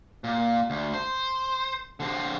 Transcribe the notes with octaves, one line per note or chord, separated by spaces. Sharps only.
A#2
D2
C5
D3 C4